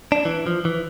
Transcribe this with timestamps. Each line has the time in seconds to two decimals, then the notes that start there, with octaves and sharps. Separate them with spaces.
0.12 D4
0.25 E3
0.47 F3
0.65 E3